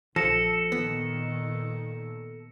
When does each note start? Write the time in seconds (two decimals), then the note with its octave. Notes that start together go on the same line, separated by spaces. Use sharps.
0.16 A#1 F3 A4 A#6 C#7 E7
0.72 A#2 D#3 B3